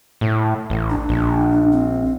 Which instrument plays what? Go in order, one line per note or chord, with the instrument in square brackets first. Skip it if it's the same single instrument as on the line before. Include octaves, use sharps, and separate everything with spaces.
[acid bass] A2
A1
[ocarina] D4
[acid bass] A#1
[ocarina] C4